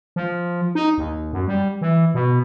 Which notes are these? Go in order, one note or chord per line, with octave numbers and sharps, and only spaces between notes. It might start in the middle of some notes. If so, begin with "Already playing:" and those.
F3
D#4
D#2
F#2
G3
E3
B2